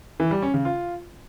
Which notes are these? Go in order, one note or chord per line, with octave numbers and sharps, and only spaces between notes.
E3
G3
C#4
C#3
F4